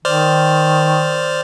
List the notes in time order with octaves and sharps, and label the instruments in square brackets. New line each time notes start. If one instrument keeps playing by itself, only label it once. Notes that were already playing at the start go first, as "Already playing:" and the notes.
[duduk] D#3 [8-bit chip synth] C5 D5 F6